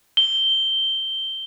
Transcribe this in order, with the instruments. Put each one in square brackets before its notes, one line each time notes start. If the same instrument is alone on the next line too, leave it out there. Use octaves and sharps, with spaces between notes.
[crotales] G7